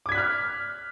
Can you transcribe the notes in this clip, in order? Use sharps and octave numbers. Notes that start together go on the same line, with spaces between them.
D6 F6 F#6 G#6 B6